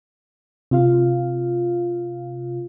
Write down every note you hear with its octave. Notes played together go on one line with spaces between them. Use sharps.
C3 F4 F5